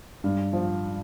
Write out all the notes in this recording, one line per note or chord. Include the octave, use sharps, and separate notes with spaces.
G2
F3